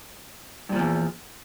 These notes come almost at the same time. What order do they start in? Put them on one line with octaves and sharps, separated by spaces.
G2 A#2 F3 E2